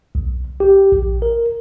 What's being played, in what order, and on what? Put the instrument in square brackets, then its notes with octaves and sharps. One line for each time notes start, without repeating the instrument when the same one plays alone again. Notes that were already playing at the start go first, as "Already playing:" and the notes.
[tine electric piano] B1
G4
A#1
A#4